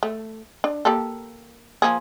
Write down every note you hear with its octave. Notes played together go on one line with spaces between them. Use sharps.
A3
D4
A#3 G4 A4
F3 A#3 G#4